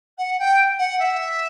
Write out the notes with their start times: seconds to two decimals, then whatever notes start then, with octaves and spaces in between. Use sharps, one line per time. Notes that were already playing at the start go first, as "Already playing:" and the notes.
0.18 F#5
0.39 G5
0.78 F#5
0.99 E5